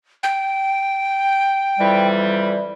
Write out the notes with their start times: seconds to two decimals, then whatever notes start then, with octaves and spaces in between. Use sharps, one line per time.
0.23 G5
1.79 F2 E3 G3